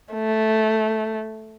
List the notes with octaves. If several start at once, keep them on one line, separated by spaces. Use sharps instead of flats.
A3